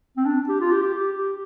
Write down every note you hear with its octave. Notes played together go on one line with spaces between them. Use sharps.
C4
D4
G4
F4
G4
G4
G4
G4